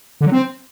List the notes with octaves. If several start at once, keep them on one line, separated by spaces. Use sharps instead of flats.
D3
F#3
C4